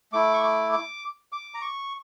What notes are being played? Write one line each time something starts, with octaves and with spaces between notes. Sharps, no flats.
A3 E4 D6
C#6
D6
D6
D6
A#5
C#6